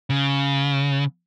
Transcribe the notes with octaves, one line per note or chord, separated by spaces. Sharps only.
C#3